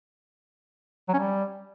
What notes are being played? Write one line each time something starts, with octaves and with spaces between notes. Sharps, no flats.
F#3
C#4
G3